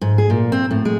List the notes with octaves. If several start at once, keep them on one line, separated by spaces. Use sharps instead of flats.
G#2
G#4
A#2
C4
A2
G#3